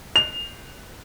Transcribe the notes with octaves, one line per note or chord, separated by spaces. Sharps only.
F7